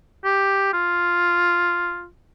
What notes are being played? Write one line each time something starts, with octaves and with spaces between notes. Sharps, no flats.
G4
F4